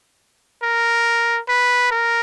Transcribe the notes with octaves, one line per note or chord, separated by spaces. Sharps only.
A#4
B4
A#4